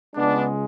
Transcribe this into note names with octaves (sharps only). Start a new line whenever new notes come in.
C#2 C#3 G#3 B3 D4